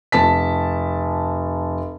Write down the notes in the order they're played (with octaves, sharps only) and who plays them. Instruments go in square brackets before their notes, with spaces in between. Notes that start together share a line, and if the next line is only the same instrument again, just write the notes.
[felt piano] F1 A5 B6